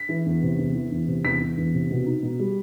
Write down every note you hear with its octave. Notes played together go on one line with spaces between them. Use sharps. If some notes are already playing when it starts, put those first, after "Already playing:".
Already playing: B6
E3
E2
C3
E2
E3
E2
C3
E2 B6
E3
E2
C3
B2
D#4
B2
G3